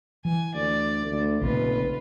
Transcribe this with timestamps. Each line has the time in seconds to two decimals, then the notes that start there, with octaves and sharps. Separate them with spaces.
0.25 E3 G#5
0.54 D2 D5
1.05 D2
1.41 F1 A#1 C#3 F4 B4